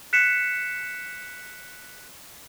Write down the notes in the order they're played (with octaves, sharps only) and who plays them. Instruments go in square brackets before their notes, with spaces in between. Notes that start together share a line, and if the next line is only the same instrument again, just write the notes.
[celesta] F#6 B6 C#7 E7